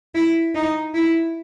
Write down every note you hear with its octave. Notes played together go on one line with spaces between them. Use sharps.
E4
D#4
E4